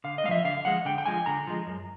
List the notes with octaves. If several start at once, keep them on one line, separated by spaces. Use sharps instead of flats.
D3 F5
D#5
G#3 F5
F3 E5
D3 F5
F3 G#3 F#5
D3 G5
G5
F3 G#3 G#5
D3 A#5
F3 G#3
F#2